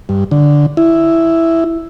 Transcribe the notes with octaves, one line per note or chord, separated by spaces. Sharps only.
G2
D3
E4